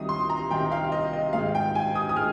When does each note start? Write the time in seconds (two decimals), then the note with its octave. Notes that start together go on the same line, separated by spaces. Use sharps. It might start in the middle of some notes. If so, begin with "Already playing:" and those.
Already playing: C2 C3 D#3 G3 D#6
0.09 C6
0.30 A#5
0.51 C2 C3 D#3 G3 G5
0.72 F5
0.92 D#5
1.13 D#5
1.33 G#2 D#3 G#3 F5
1.55 G5
1.75 G#5
1.95 D#6
2.09 D#6
2.16 G#3 F6